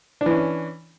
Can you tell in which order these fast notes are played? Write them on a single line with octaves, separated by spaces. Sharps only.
D4 E3 C#4